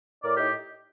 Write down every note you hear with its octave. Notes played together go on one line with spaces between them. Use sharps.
A2 A#4 D5
D#4 G4